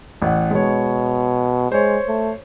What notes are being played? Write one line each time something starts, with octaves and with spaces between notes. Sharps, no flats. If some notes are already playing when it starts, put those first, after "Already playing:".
A1 F#5
B2 G#3 C#5
G#3 C5 C#5
A3